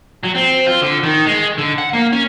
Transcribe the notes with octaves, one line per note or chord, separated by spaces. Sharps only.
F#3
C4
F4
D3
D#3
G#3
D3
F#5
A#3
C#4